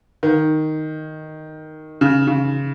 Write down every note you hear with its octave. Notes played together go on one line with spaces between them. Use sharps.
D#3
C#3
C#3